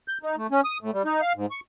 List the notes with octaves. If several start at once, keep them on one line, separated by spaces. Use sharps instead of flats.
G6
D#4
A3
C#4
D#6
A2
G3
D#4
F5
G#2
C#6